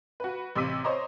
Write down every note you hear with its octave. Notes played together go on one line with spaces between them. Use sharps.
F#4 B4
A1 C3 D6 E6 B6 D#7
C5 C#5 D#5 A#5 C6 D6